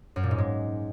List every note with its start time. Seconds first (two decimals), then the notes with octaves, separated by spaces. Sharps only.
0.16 F#2
0.23 A#2
0.31 G#2
0.38 G#3